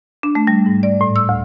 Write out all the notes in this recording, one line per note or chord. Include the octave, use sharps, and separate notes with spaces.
D4
A3
G3
G#2
D5
A2
E6
D2